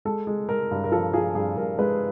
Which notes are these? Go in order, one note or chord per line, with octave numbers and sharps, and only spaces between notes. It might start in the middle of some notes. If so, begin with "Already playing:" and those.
G#3 A4
G#3
G#3 A#4
G2
A#4
F3 A4
F3 G#4
G2 G#4
G2 A#4
G#3 B4